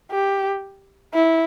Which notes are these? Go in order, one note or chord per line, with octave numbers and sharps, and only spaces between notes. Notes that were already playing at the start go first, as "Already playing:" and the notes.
G4
E4